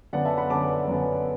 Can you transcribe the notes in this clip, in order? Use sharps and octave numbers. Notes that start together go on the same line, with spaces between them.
F#2 D3 B3 D5 F#5
E5 A5
F#5 B5
F#2 D3 B3 A5 D6
F#2 D3 B3